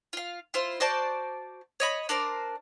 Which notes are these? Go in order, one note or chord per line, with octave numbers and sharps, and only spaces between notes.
F4 F5
E4 F4 C5
F#4 C5 D5 A5
C#5 D#5 B5
D4 A#4 C5 D5